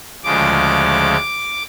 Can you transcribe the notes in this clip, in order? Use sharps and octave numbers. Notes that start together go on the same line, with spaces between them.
D2 C#3 F3 G#3 D6